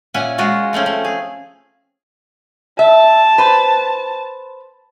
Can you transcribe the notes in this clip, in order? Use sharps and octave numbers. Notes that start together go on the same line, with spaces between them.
A#2 C#4 E5 F#5 G#5
G#3 F4 F#4 C#5
F3 A3 C4 C#4
A3
G#4
E5 A5
B4 C5